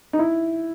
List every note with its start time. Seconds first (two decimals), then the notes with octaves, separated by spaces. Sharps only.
0.13 D#4
0.19 E4